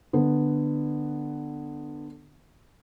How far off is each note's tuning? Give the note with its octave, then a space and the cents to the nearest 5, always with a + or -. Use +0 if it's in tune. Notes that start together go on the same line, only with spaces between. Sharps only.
D3 +15 B3 +0